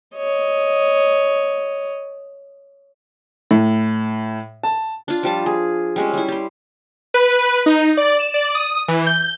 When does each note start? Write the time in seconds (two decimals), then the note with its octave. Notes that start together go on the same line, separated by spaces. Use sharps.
0.16 C#5 D#5
3.51 A2
4.64 A5
5.08 D4 F4
5.23 F3 G3 A5
5.46 G#4
5.96 G3 G#3 C#4
6.13 G3 E4
6.28 G4 C6
7.14 B4
7.66 D#4
7.97 D5
8.19 E7
8.34 D5
8.55 D#6
8.88 E3
9.07 G6